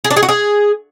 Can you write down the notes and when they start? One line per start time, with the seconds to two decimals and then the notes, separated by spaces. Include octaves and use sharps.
0.04 G#4
0.10 D4
0.17 G#4
0.23 F#4
0.29 G#4